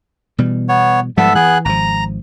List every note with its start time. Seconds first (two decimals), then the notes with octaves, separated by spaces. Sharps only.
0.38 B2 E3 G3
0.69 B3 C#5
1.17 G#2 F3 G3 B3 A4 E5
1.35 E3 B3 G#4 F#6
1.65 G#1 F3 A#5